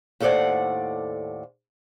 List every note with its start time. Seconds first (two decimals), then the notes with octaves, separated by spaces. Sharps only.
0.20 D#2 A2 A4 C5 D5 F#5